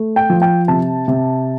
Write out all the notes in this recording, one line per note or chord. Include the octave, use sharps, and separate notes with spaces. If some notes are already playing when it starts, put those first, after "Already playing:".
Already playing: A3
G5
F3
G5
C3 A5
C3